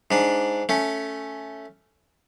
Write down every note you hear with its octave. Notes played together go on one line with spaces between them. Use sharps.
G#2 D4
A3 C#4